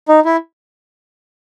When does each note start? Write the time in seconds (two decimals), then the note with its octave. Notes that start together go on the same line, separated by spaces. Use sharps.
0.09 D#4
0.25 E4